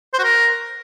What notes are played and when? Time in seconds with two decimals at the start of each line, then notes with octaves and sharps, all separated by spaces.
0.14 C5
0.19 F#4
0.24 A#4